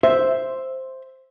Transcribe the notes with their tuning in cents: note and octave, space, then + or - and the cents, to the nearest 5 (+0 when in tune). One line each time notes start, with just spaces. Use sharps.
C5 +0 E5 +0